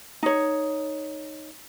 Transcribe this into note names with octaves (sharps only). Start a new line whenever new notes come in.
D#4 C#5